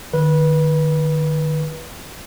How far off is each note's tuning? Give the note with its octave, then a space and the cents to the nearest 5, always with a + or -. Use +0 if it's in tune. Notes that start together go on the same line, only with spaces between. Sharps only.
D#3 -35 B4 -20